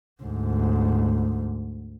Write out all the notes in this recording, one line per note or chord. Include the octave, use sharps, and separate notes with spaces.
D2 G#2